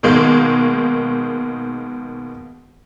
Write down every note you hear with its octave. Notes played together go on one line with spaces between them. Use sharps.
B2 D#3 G#3 A#3